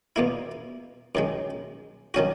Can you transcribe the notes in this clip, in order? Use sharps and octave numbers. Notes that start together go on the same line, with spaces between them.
E2 B2 A#3 E4
F#2 D#3 G#3
D#3 F#3 C#4 F#4